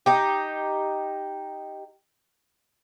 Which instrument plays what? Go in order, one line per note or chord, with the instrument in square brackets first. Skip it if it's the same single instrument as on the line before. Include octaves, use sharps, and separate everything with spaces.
[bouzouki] D#4 G4